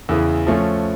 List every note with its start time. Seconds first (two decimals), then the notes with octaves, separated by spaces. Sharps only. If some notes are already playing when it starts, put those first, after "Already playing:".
0.09 E2 C#3 E3
0.47 F3 A3 C#4